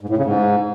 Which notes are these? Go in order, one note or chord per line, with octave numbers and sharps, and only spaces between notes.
G#2
A2
C#3
G#2